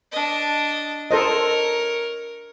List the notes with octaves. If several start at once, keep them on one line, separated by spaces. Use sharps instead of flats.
D4 D#5
A4 A#4 C5 C#5 D#5